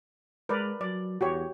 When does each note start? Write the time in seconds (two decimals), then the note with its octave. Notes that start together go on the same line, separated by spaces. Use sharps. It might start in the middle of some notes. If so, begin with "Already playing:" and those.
0.49 G#3 A#4 B4 D5
0.81 F#3 D5
1.21 E2 F#4 G4 C#5